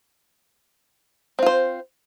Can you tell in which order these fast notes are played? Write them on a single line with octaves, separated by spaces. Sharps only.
C4 F4 C5